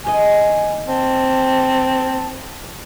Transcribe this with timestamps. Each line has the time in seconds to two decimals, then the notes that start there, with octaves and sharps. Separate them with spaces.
0.05 D#2 G4 D#5 G#5
0.87 C4 A5